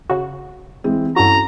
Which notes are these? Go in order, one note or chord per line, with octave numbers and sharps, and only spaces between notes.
C#3 F#4
E3 G#3 C4
G2 C#4 E4 F#4 A4 A#5